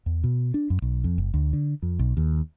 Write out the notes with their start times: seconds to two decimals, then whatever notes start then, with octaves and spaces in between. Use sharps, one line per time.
0.06 E2
0.24 B2
0.54 D4
0.70 F#2
0.82 B1
1.04 F2
1.18 F#1
1.34 D2
1.53 D3
1.82 F2
1.99 B1
2.17 D#2